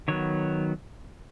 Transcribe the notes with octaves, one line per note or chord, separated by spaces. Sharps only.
D#3 F#3 B3 C#5